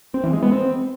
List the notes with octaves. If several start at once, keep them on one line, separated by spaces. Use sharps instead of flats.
C4
E3
G#3
B3
C4